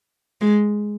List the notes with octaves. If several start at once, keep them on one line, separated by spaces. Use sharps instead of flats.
G#3